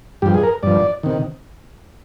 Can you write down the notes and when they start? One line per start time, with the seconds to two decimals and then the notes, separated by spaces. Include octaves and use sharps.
0.22 G2 F3 G4
0.34 G#4
0.43 A#4
0.63 G2 F3 D5
1.03 C3 D#3